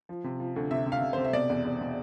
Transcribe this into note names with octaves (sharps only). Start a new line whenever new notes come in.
F3
C3
F3
D2
C3 E5
C3
F5
C3
C3 C5
E5
B2 D5
E2
E2
B2